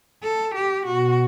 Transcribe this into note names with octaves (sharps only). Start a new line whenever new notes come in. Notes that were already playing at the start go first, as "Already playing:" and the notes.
A4
G4
B2 F#4